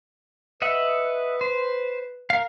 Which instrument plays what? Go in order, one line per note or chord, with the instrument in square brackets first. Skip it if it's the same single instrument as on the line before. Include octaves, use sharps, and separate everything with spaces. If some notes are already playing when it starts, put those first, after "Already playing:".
[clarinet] B4 [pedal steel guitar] D#5 E5 F#5
[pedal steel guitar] C5
A#4 F5